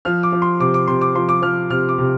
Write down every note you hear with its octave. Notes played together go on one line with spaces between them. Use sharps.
F3 F6
D6
F3
C6
C3 D6
D6
C3 C6
D6
F3 C6
D6
F3 F6
C3 F6
D6
C3